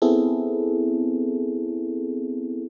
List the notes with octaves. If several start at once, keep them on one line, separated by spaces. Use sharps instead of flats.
B3 C4 E4 G#4 A4